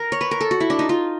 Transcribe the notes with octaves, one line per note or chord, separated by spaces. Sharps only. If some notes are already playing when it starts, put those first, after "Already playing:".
Already playing: A#4
C#5
B4
A#4
A4
F#4
E4
D4
D#4
F4